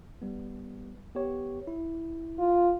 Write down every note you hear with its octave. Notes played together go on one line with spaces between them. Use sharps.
G3 B3
B3 G4 C#5
E4
F4